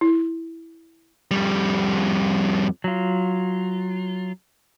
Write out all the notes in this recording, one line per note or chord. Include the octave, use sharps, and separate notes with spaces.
E4
F2 G3
F#3 F4